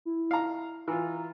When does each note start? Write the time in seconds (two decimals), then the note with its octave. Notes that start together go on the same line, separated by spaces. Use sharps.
0.05 E4
0.31 F5 A#5
0.88 E3 F4 A#5